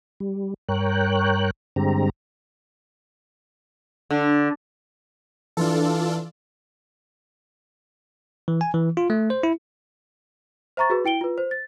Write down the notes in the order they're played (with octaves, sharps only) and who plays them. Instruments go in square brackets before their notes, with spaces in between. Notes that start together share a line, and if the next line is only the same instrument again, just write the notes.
[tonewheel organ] G3
G2 A#4 C#5 G5 F#6
G2 D3 G#3 C4 G4 A#5
[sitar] D3
[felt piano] E3 [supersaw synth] D4 F4 A4
[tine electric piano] E3
G#5
E3
F4
A3
C5
E4
[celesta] C5 E5 A#5 C#6 A6
F#4 G#4 B4
E4 G5 D7 G7
F4 B4
C5
A6